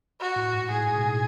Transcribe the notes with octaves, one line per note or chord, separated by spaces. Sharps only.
F#4
A2
G#2
A2 G#4
G#2
B2
A2